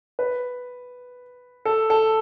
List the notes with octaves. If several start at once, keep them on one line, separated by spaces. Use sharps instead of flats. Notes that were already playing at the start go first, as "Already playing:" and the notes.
B4
A4
A4